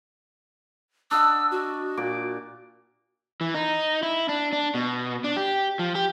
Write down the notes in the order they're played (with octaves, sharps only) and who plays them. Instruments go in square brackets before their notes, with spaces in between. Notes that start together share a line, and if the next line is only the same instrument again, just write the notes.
[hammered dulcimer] D4 D#5 F#5 [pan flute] E6
[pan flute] F#4
[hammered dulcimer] A#2 F#5 D6
[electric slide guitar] E3
D#4
E4
D4
D4
B2
D4
G4
F3
G4